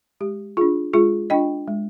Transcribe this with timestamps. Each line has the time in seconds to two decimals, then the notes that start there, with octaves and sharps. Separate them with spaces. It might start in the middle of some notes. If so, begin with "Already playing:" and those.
0.21 G#3 G4
0.57 D4 F4 G#4
0.93 G#3 F4 G#4
1.30 D4 F4 D#5 G5
1.68 G#3